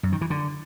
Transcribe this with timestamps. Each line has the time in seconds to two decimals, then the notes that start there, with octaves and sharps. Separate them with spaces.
0.03 F#2
0.12 D#3
0.21 E3
0.30 D3